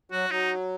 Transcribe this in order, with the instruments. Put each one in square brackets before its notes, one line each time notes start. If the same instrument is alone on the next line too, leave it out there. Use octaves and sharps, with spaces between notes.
[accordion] F#3 [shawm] F#4
[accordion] F#3 [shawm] D#4